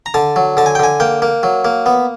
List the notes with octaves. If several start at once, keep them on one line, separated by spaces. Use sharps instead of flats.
A#5
D3 A5
F#3
D3 A5
G#5
G5
D3 G#5
A#3 G5
A#3
F#3
A#3
B3